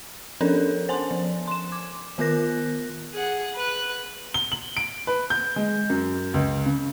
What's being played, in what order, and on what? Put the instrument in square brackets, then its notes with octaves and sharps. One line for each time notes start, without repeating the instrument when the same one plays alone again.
[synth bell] F3 C#4 D4 A4 A#4 C#5
C5 G#5 A5 C6
F3
C6 E7
D6
D#3 B3 F4 A#4 F#6 A#6
[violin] G#4 F#5
B4 F#6
[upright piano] G7
F#7
D7
B4
G6
G#3
F#2
C#2
C#3